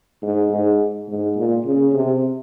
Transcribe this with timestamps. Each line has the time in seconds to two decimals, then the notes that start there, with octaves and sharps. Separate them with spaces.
0.23 G#2
0.51 G#2
1.09 G#2
1.37 A#2
1.65 C#3
1.94 C3